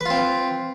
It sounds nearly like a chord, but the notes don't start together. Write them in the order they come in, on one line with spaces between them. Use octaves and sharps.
B4 F4 C4